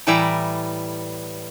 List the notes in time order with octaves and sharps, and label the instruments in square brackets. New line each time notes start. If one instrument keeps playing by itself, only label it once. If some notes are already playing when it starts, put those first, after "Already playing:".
[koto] A2 E3 G3 D5 E5 A#5